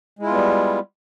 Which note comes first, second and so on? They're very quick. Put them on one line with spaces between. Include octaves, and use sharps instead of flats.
G#3 E4 F4 B3 G3